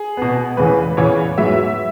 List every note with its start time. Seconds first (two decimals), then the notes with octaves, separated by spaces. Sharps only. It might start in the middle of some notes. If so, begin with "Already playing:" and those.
Already playing: G#4
0.17 B2 B3
0.57 E2 C#3 E3 B4
0.97 E2 C#3 E3 C#5
1.37 G#2 F#3 B3 E5